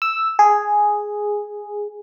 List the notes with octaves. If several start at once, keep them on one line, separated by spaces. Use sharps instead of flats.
E6
G#4